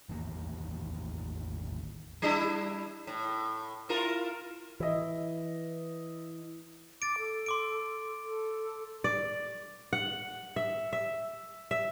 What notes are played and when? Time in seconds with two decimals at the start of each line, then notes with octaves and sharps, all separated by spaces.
0.09 A1 E2 D#3 A#3
2.22 G3 D4 E4
3.07 A2
3.89 E4 F4 A#4
4.80 E3 E4 D#5
7.02 D6 A6 D7
7.18 A4
7.46 C6 D6 D7
8.24 A4
9.04 D5
9.93 F#5
10.56 E5
10.93 E5
11.71 E5